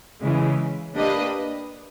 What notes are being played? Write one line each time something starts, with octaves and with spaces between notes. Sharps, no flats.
C#3 E3 G#3
A#3 D4 G4 B4 D#5